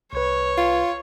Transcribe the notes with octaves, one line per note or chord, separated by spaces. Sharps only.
C2 B4 C#5
F4